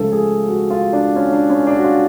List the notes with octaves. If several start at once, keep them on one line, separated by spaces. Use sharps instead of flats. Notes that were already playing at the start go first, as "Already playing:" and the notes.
Already playing: C#2 C#3 F3 A3 A4
G#4
F#4
F4
D4
C#4
D4
C#4
D4
F#4
F4